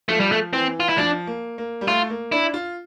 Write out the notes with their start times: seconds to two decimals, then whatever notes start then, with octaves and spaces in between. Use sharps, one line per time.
0.09 F3 A3
0.20 G3
0.32 A3
0.53 E3 C4
0.80 F4
0.89 E4
0.97 F3 D4
1.27 A#3
1.58 A#3
1.81 G3
1.87 A3 F4
2.10 A#3
2.32 D4 E4
2.54 F4